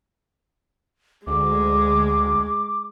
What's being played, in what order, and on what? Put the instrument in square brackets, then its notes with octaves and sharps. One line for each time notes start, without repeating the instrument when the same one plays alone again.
[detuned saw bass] D2 [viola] G#3 [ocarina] D6